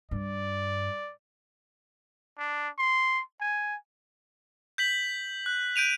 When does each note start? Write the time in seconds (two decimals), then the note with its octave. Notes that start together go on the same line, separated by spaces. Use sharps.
0.11 G2 D5
2.38 D4
2.78 C6
3.41 G#5
4.78 G6 B6 F#7
5.46 F#6
5.76 G6 D7 D#7 F7